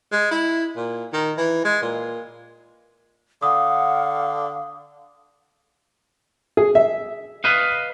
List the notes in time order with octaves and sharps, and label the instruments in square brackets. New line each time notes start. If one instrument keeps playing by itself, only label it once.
[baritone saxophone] G#3
E4
A#2
D#3
E3
G#3
A#2
[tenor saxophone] D3 [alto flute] F5 [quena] F#5 [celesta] D#6
[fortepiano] G#4
E5
[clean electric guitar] B4 D#5 F5